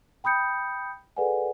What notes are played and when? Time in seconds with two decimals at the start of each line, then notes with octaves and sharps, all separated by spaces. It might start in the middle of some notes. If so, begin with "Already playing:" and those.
0.24 G5 B5 D#6 G6 C#7
1.17 G#4 A4 B4 D5 F#5 G#5